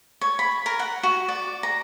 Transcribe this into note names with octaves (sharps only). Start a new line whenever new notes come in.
C#5
B5
A#4
F#5
F#4
D5
A#5